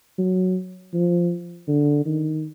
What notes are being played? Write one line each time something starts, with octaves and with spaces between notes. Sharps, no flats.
F#3
F3
D3
D#3